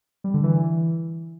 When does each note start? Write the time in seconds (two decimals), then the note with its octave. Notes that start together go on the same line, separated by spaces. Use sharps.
0.24 G3
0.34 D3
0.43 E3